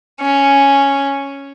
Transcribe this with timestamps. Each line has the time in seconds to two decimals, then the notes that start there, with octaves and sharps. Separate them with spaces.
0.21 C#4